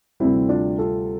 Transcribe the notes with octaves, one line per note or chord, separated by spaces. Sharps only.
D2 C3 G3 C4 E4
D4 F4
F4 A4